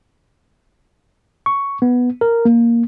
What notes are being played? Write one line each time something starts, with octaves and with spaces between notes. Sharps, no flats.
C#6
B3
A#4
A#3